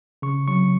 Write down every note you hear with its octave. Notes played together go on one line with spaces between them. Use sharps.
C#3 C#6
F#3 C#6